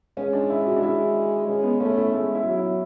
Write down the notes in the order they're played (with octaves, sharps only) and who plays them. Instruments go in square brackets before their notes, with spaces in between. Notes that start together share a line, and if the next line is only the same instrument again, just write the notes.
[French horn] G#3 [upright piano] C#4
[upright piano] D4
E4
F#4
D4
[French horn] G#3 [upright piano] E4
[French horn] G#3 [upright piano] C#4
[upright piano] B3
[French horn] A3 [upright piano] C#4
[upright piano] E4
[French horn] G#3 [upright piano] E4
[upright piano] E4
[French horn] F#3
[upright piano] E4